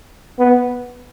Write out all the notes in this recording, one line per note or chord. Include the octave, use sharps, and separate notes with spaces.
B3